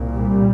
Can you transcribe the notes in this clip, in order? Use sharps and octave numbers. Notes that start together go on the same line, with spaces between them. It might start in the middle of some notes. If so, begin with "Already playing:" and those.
Already playing: C2 A#2
G3